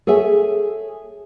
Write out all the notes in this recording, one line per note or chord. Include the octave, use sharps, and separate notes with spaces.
G#4 A4 C#5 E5 G#5